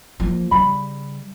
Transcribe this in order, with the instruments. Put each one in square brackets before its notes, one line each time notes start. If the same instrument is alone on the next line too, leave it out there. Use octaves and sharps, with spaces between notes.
[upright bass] F3 A#3
[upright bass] C#3 G3 [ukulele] B5